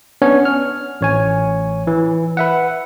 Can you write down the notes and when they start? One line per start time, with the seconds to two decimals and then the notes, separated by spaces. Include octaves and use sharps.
0.22 B3 C#4 D4 C#5
0.45 F6
1.01 A1 C#5 G#5
1.87 E3
2.37 B4 E5 F#5